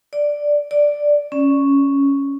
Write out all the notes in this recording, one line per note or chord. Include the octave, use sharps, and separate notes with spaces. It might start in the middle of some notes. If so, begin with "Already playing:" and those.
D5
D5
C#4